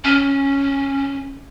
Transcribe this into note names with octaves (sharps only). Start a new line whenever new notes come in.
C#4